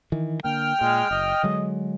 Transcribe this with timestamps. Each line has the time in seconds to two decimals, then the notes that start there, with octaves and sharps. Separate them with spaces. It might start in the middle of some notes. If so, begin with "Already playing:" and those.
0.12 D#3 E3
0.44 D3 A#3 G5 F6
0.81 A#2 G#3
1.11 F#1 D#5
1.43 D3 F#3 G#3